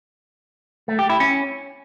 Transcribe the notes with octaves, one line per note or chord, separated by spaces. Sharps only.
A3
G4
E4
C#4